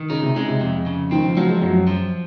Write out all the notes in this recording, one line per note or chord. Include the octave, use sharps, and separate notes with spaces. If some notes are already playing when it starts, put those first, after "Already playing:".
Already playing: D#3
C#3 D#4
C3
C#3 G#3
C3
F2
C#3
D#3 C4
F3
F3 F#3
G#3
F#2 F#3
F3